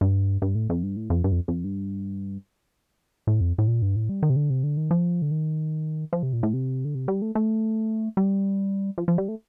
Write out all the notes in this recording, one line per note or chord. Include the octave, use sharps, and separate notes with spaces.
G2
G2
A2
F2
G2
A2
F2
G2
F2
F2
G2
A2
F2
A2
A#2
G2
A2
G3
D#3
C3
D3
C3
D3
D#3
F3
D3
D#3
F3
C3
A#2
A2
C3
D3
C3
G3
A3
A3
G3
F3
F3
G3
A3